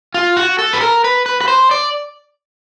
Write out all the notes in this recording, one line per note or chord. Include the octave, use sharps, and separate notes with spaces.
F4
F#4
A4
B4
A#4
B4
B4
B4
C5
D5